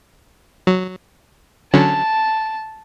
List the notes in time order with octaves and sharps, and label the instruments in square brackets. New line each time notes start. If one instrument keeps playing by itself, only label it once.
[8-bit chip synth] F#3
[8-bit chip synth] D3 F#3 C#4 [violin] A5